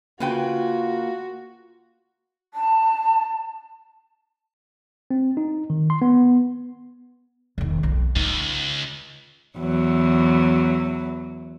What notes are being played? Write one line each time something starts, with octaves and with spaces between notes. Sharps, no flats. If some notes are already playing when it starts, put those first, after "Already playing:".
C#3 A#3 F4 F#4 B4 G5
A5
C4
D#4
D#3
C6
B3
E1 D#3
B1 F2
C#2 D#4
E2 F#3